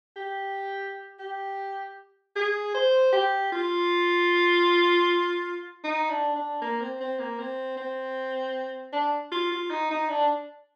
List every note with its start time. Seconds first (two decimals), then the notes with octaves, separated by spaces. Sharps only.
0.16 G4
1.19 G4
2.36 G#4
2.75 C5
3.13 G4
3.52 F4
5.84 D#4
6.10 D4
6.36 D4
6.61 A#3
6.81 C4
7.00 C4
7.19 A#3
7.39 C4
7.77 C4
8.93 D4
9.32 F4
9.51 F4
9.70 D#4
9.90 D#4
10.09 D4